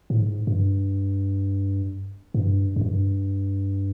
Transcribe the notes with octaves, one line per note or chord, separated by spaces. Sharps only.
A2
G#2
G2
G#2
G2
F#2
G2